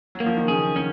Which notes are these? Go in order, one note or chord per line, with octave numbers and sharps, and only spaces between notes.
F#3
A#3
F3
D#3
C#3 G#4
D#3 C#4